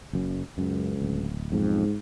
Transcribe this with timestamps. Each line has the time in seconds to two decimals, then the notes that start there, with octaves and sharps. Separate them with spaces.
0.13 F#1 F#2
0.58 C#2 F#2
1.02 D1
1.52 B1 F2 G#2